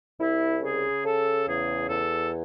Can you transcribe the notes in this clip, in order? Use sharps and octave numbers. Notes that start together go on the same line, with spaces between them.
C2 E4
C#3 G#4
C#3 A4
E2 G#4
E2 A4